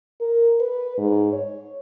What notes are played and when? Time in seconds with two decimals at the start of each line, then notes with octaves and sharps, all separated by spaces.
0.21 A#4
0.60 B4
0.98 G#2
1.32 C#5